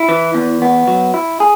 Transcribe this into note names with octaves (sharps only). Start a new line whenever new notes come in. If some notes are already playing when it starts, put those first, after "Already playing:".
Already playing: E4
E3
E2
B3
F#3
E4
G#4